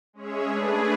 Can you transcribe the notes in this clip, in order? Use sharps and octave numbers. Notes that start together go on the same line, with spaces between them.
G#3 C#4 G#4 C#5 E5
A3 D4 G#4 B4